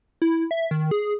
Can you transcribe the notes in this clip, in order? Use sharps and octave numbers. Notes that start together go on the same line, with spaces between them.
E4
E5
D#3
G#4